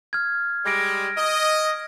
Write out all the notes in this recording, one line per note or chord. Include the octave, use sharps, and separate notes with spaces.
F6 G#6
G3 G#3 G#6 A#6 D7
D#5